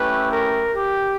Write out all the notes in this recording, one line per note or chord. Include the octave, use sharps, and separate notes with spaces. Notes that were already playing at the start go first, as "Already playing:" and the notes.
Already playing: A3 C#4 E4 G4 B4
A#4
G4